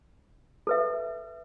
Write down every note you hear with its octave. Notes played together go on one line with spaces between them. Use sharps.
A4 B4 E5